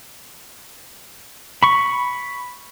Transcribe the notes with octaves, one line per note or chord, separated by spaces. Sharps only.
B5 C#6